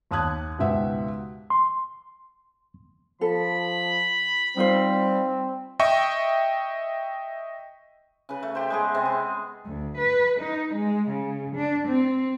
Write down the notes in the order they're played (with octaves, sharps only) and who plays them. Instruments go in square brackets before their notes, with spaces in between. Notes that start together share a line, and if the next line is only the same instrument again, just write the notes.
[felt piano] D#2 A5 D#6 F#6 G#6
C#2 G#2 B2 G4 E5 F#5
[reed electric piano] C6
[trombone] F3 [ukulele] A4 [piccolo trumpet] B5
[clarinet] G3 [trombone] C4 [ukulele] D#4 F4 C5
[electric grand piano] D#5 E5 G5 C#6
[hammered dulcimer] C#3 B4
A3
G4 C5
G#3 B3 G#4
C3 C4
B3
[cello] D2
B4
D#4
G#3
C#3
D4
C4